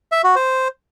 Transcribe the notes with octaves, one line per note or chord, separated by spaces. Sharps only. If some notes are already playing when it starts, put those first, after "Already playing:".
E5
F#4
C5